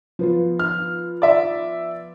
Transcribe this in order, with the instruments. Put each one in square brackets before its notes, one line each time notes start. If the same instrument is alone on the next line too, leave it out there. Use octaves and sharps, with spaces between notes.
[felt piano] F3 B3 F4
[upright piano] F6
D5 E5